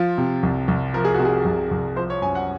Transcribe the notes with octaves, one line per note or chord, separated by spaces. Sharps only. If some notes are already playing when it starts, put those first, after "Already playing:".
Already playing: F3 F4
C3
C2
C2
F3 A#4
G#4
F#4
C3
G#4
C2
C2
F3 C5
C#5
F#2 G#5
F#5